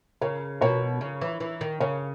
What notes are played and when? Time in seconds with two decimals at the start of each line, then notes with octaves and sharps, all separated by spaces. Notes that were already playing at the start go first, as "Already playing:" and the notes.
0.21 C#3 A#4 C#5
0.61 B2 A#4 C#5
1.01 C#3
1.21 E3
1.40 E3
1.61 D#3
1.80 C#3 A#4 C#5